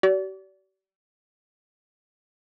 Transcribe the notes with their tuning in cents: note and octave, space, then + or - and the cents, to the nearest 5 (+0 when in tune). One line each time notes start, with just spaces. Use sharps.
G4 -45 D5 -30